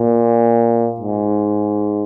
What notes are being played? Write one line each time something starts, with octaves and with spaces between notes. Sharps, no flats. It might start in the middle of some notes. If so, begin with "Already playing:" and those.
Already playing: A#2
G#2